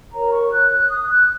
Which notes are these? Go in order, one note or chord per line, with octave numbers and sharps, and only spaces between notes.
F#4 A#4 C#5 A#5
C#6
F#6
F#6
D#6
F#6